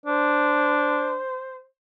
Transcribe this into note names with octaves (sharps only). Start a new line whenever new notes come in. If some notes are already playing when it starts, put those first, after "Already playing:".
D4 C5